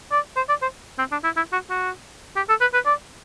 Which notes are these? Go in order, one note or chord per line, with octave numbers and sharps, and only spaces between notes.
D5
C5
D5
C5
C4
D4
E4
E4
F#4
F#4
G4
A4
B4
B4
D5